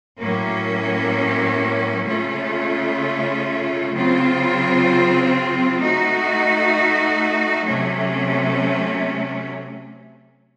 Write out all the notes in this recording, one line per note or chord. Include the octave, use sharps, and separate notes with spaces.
A2 F#3 A#3 C#4
C#3 A3 C#4 F4
C#3 F#3 C4 F4 C5
A3 D#4 F#4
C3 F#3 A3 C#4